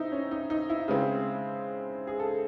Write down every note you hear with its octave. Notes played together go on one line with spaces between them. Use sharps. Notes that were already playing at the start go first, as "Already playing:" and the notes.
Already playing: C4 D#4 E4
C#4
D#4
D#4
E4
C#3 G#3 C4
G#4
A4